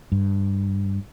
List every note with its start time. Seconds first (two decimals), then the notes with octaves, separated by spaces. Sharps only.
0.12 G2